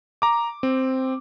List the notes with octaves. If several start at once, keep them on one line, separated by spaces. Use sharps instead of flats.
A#5 D6
C4